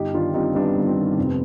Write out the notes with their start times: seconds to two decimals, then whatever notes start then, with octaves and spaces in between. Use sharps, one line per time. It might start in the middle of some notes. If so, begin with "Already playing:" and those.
Already playing: G1 D#4 G4
0.14 D#3 D4 F4
0.34 G3 C4 D#4
0.55 G2 B3 D4
0.77 G1
0.87 C4
0.97 D#3
1.17 F1 C4
1.25 B3